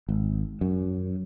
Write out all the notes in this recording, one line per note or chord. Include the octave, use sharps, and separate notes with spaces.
G#1
F#2